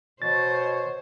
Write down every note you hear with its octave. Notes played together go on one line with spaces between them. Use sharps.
B2 C5 C#5 A6